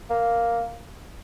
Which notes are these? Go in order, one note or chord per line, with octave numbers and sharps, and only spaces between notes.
A#3